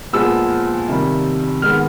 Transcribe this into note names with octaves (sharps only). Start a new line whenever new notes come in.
A#2 F3 G#3 B3 E6
C3 D#3 G3
G#2 D#3 G#3 B3 F6